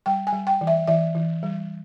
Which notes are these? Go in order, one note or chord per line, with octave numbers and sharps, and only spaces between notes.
G3 G5
G#5
G3
G5
E3
E5
E3 E5
E3
G3